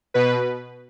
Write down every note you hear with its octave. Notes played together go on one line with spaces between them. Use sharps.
B2 B4